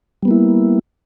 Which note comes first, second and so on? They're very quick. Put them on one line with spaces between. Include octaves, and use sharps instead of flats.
G3 B3 A#3 E4